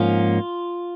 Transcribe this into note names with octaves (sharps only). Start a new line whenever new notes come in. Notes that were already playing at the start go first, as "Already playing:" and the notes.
Already playing: G#2 F3 A#3 C#4 F4